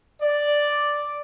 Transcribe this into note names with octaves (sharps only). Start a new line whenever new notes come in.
D5